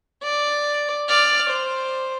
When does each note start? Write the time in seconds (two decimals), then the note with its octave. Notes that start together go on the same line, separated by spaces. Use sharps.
0.24 D5
1.09 D5 F6
1.50 C5